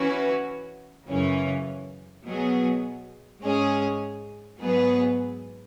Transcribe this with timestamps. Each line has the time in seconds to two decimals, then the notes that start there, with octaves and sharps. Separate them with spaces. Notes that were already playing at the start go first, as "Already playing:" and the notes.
Already playing: E3 C#4 F#4 B4
1.07 F#2 C#3 E3 C#4
2.24 B2 F#3 B3 G#4
3.41 G#2 G#3 C#4 G#4
4.59 G#2 F#3 B3 G#4 B4